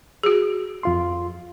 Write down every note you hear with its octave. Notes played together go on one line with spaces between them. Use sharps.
F#4 G#4
F2 F4 C6